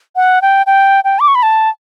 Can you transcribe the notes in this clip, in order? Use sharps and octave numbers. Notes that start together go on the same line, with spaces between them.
F#5
G5
G5
G5
D6
C#6
B5
A5